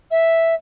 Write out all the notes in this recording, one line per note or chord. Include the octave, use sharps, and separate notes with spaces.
E5